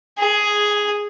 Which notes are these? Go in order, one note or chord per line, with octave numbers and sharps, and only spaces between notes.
G#4